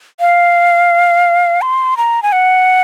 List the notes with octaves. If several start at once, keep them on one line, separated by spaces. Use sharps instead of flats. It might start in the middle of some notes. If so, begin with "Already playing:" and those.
F5
C6
A#5
G#5
F#5